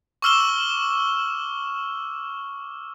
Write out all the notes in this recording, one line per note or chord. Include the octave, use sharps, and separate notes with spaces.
C#6 D6 E6 F6 E7 G7